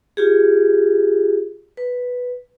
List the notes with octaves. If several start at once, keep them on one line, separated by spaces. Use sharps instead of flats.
F4 G4 G#4
B4